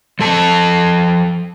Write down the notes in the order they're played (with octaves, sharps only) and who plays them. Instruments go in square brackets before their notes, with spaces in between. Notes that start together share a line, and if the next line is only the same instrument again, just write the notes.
[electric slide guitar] F3 A4 A5